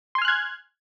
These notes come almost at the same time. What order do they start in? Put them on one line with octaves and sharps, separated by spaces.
C6 G#5 F6 F#6 G#6